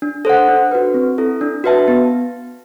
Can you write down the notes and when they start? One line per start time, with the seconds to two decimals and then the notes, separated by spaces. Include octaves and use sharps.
0.02 D4
0.25 A4 C5 F#5
0.48 D4
0.71 F#4 B4
0.94 C4
1.18 E4 A4
1.41 D4
1.64 F#4 B4 E5 A5
1.88 B3